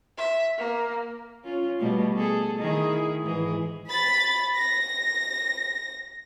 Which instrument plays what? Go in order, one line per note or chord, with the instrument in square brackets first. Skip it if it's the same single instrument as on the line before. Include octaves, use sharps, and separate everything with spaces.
[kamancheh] E5
A#3
[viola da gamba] C#4 F4
B2 G3 A3
G#4 A4
D#3 E4 G#4
G#2 E3 G#4
[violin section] B5 A6
A#6